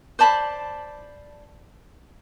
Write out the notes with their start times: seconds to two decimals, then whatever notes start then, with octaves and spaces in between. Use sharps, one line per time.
0.19 C5 D5 A5 B5